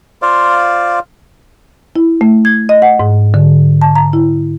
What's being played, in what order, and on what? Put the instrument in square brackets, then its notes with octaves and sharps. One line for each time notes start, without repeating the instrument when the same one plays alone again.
[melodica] F4 C5 D5 F5
[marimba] E4
A3
G#6
D#5
F#5
G#2
D3
A5
A#5
E4